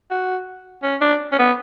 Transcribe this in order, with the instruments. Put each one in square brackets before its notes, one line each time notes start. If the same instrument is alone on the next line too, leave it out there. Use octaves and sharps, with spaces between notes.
[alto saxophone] F#4
C#4
D4
C#4
B3